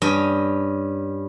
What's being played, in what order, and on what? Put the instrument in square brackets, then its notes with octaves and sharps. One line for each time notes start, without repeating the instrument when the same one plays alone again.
[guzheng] G2 C#4 D#5